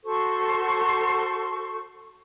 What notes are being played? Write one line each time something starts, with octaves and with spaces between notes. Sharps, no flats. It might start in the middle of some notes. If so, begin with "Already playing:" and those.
F#4 A4 C5 C#6